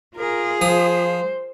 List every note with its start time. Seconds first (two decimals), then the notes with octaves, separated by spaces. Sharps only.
0.17 F4 G#4 A#4
0.61 F3 C5 D#6